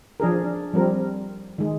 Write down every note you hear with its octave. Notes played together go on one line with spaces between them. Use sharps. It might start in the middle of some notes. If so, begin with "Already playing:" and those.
F3 D4 G#4 A#4
D4
F3 G3 C4 A#4
D#3 G#3